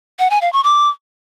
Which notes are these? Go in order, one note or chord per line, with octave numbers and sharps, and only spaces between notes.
F#5
G#5
F5
C#6
D6